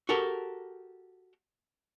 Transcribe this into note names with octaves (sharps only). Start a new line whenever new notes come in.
F#4 G4 A4 A#4